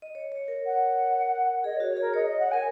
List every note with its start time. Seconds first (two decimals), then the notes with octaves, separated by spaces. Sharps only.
0.02 D#5
0.15 C#5
0.32 C#5
0.48 A#4
0.65 F#5
1.64 G#4 D#5
1.76 C#5
1.80 F#4
1.88 C#5
1.97 G#4 A#4
2.14 C#5 D#5
2.26 D#5
2.39 F#5
2.51 A#4 G#5